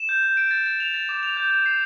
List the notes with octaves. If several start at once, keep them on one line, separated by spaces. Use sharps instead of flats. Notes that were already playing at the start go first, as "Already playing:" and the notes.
Already playing: E7
G6
G6
D7
A6
A6
F7
A6
D6
F7
G6
G6
C7